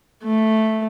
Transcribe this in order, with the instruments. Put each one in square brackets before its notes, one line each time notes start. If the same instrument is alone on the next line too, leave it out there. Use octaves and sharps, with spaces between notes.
[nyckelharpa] A3